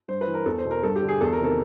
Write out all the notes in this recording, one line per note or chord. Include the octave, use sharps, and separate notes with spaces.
G2 C5
B4
E3
A#4
E2 A4
C5
B2
A#4
G2 A4
G4
D3
G#4
E2 A4
A#4
C3 D#3 A4